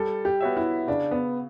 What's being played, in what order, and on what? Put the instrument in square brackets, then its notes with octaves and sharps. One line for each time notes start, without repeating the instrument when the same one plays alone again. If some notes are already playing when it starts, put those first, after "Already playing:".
Already playing: [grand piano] G3 [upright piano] A4
[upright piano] G4
[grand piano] B3 F#4 C#5 E5
[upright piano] E4
[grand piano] C#3 [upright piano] D4
[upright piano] B3